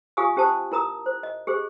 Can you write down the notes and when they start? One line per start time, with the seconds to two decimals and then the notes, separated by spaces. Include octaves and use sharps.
0.17 F4 G4 F5 G#5 C#6 D#6
0.37 C#4 G4 C5 A5 D#6
0.72 E4 A#4 A#5 D#6
1.06 C5
1.23 D#5
1.47 G4 G#4 C5